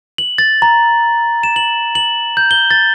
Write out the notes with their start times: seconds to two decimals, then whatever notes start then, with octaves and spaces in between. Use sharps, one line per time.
0.18 F#7
0.38 A6
0.62 A#5
1.43 E7
1.56 F#7
1.95 F#7
2.37 G6
2.51 G7
2.71 A6